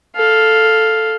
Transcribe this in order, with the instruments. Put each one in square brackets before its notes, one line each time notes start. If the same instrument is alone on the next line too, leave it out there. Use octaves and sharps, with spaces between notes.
[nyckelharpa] A4 F5